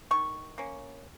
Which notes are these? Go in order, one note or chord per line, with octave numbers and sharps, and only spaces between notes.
D#3 C#6
A#3 C#4